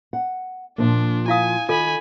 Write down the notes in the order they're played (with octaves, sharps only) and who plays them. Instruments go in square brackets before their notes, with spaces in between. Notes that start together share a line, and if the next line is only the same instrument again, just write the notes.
[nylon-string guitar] F#5
[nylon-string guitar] A#2 F3 A#3 [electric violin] D4
[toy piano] E4 F5 D#6 [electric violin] G#5
[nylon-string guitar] D#3 [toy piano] F4 A4 [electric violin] G#5 B5